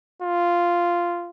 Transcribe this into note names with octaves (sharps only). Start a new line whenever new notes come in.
F4